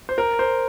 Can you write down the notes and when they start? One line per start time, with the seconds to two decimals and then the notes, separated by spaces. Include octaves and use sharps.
0.09 C5
0.18 A#4
0.39 C5